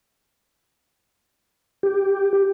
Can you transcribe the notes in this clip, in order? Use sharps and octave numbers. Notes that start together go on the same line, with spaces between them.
G4